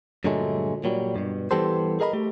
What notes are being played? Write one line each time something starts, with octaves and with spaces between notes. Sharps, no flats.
G2 A#2 D3 F#3 G#3 A3
A#2 F#3 G3
G2 B2
E3 G3 B3 G4 A4 C5
G#4 A#4 D#5 G#5 B5
A3 G4